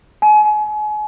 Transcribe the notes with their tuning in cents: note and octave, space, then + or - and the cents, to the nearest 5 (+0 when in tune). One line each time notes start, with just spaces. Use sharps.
G#5 +35